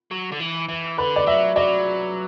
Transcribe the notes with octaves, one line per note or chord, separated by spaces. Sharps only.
F#3
D3
E3
E3
D3 B4
D5
F#3 E5
F#3 D5